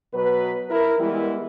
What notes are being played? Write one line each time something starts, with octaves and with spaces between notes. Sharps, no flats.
B2 F#3 B4
E4 A#4
E3 G3 G#3 B3 E4